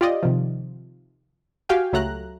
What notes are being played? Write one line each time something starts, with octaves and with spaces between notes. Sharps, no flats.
F4 G4 D5 D#5
C3 D#3 F3
F#4 G4 F5 G5 G#5
C#2 F#3 A3 A#5 F#6